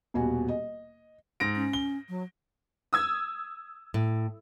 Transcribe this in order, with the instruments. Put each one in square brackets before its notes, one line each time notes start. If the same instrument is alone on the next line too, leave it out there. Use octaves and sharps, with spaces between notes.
[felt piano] D#1 B2 F#4 G#5
D#5
[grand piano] G#2 A#6 D7
[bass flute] C#4
[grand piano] G7
[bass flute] F#3
[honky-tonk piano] D#6 E6 G#6
[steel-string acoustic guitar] A2